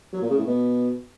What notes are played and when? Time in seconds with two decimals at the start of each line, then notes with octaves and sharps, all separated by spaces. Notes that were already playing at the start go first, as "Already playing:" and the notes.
0.13 F#3
0.21 A#2
0.30 C#3
0.38 A2
0.46 B2